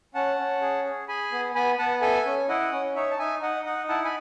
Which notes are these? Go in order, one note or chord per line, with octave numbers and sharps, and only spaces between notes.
C#4 F#5 A5
C#4
G#4
G#4
G#4 G#5 B5
B3
B3 G#5 B5
B3 F#5 A5
A4 E5 G#5
C#4
E4 D#5 F#5
C#4
D#4 C#5 E5
A5
D#4 E5 G#5
D#4 D#5 F#5
D#4 D#5 F#5
E4 F#5 A5
G#5 B5